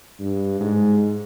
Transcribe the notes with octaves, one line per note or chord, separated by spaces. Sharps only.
G2
G#2